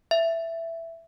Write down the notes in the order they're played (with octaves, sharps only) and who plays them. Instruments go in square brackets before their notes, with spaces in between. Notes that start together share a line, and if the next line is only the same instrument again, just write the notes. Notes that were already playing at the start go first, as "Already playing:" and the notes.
[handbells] E5